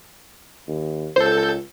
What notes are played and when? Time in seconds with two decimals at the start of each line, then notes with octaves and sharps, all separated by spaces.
0.67 D#2
1.16 C#2 A4 C5 G6